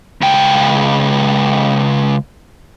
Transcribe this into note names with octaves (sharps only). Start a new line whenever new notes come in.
C#2 G5